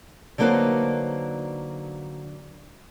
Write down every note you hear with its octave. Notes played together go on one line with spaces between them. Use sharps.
D3 F#3 A#3 D#4 B4 C5